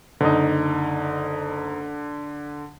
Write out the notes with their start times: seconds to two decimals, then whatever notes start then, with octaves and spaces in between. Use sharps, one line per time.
0.21 F#1 D3 D#4